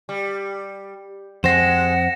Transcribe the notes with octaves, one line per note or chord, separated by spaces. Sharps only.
G3
F2 G#3 C4 C5 F#5 A#6 E7